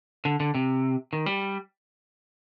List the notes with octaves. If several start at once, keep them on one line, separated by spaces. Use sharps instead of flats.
D3
D3
C3
D#3
G3